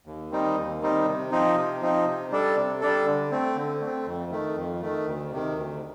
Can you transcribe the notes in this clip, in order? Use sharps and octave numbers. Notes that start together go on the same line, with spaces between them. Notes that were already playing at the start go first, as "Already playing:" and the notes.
D#2
D#3 G3 C4 D#4
D#2
D#3 G3 C4 D#4
C3
F3 C4 D#4
C3
F3 C4 D#4
C3
G3 D4 A4
C3
G3 D4 A4
D3
A3 C4
D3
A3
C4
F2
D#3 A3
F2
D#3 A3
D2
C3 D#3
D2